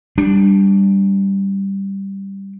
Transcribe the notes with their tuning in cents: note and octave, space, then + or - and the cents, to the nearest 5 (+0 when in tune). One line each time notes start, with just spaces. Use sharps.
G3 +0 D4 +0